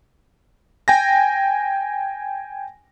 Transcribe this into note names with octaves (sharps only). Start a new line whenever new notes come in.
G5 G#5 A#6